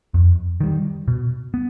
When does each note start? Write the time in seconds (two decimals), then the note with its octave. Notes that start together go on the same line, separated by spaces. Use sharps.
0.14 F2
0.61 D#3 G3
1.08 B2
1.54 B3